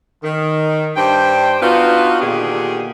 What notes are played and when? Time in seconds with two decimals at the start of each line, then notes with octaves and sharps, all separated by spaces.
0.23 D#3
0.97 G2 D4 C5 G5
1.62 B3 D4 D#4 F4 F#4 B4
2.21 A#2 D3 D#3 G4 G#4